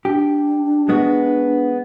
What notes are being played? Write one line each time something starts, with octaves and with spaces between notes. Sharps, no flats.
D4 G4
G#3 B3 F#4